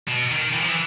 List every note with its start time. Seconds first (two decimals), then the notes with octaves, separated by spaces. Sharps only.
0.08 B2
0.31 D#3
0.54 E3
0.61 F3
0.68 E3